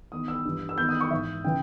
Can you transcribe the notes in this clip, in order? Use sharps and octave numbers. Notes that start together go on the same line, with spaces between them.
E2 D#3 D#6
E6
G2 E3
E6
E2 D#3 G6
D#6
C#6
G#2 E3 E5
C#3 E3 G5